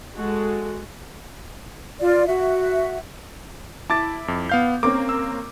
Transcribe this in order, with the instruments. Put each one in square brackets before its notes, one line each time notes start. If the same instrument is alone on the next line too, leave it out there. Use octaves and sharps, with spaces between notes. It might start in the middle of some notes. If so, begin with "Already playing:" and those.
[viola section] G#3 F#4 A4
[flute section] F4 D5
F#4 E5
[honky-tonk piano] E4 [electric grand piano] A5 D6 A6
[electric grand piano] F2
B3 F5 G6
[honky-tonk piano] A#3 C4 C#4 [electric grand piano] D6
[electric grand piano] E6